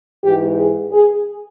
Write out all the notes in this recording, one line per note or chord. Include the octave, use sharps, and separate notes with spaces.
G#2 E3 G4
G#4
G#4